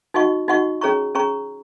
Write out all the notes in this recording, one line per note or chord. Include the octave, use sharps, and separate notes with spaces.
D#4 F#4 D#5 F#5 C#6
D#4 F#4 D#5 F#5 C#6
C#4 G#4 C#5 A#5 C#6
C#4 G#4 C#5 A#5 C#6